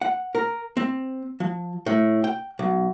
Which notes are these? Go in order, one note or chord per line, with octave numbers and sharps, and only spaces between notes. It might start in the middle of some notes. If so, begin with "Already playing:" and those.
F#5
A#4
C4
F3
A2
G5
B1